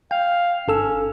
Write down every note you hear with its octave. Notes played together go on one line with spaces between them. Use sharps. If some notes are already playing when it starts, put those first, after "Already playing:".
F5 G5
G1 C#4 A4 E6